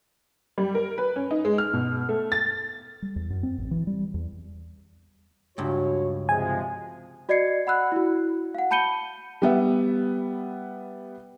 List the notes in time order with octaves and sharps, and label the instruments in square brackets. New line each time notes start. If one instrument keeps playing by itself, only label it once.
[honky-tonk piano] G3
A#4
B4
C#4
D#4
G#3
F6
B2
A3
A6
[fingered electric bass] G3
E2
F#2
C4
A1
E3
G3
E2
[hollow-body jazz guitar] C#2 G2 [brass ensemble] F#4 C#5
[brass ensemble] C3 F3 G#3 [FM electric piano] G#5
[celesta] F#4 D5 D#5 G#6 C7 C#7
F#5 B5 E6 F#6
E4 F#4
F5 F#5
A5 B5 G6 C#7 D#7 G7
[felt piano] G3 B3 E5